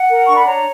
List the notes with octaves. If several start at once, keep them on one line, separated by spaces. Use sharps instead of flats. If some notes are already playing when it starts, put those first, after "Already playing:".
Already playing: F#5
A#4
D4 C#6
B5
C#5 A#5